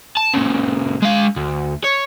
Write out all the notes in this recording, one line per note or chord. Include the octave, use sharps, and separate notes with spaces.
A5
A#2 C#3
G#3 F5
D2
C#5